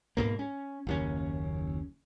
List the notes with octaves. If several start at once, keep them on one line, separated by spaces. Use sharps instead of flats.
G#2 B2 A#3
C#4
F#1 D#2 C#4